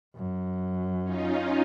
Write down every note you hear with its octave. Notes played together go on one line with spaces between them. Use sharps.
F#2
C#4 D#4 F4